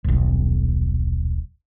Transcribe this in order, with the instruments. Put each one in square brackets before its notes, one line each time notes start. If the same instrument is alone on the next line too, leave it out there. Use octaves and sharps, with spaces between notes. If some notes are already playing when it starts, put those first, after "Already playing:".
[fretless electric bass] D#1 B1